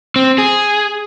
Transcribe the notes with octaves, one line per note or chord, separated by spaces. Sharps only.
C4
G#4